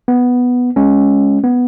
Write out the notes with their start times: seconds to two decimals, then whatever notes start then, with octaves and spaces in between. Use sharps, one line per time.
0.08 B3
0.76 G#3 C#4
1.44 B3